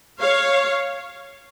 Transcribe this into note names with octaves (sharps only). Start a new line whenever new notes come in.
C#5 F5